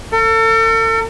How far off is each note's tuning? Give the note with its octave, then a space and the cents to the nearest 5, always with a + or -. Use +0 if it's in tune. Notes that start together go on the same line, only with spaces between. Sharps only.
A4 +40